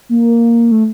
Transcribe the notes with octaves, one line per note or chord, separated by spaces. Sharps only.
A#3
A3